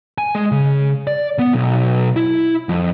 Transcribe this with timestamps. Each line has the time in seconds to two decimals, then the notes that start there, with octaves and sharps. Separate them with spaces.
0.18 G#5
0.35 G#3
0.52 C#3
1.07 D5
1.39 B3
1.53 B1
2.16 E4
2.69 F2